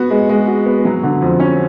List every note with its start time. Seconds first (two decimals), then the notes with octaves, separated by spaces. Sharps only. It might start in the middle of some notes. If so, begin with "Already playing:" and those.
Already playing: B3 F#4
0.10 G#3
0.29 G#3
0.47 F#4
0.66 B3
0.85 F#3
1.03 D3
1.22 F2
1.40 C#4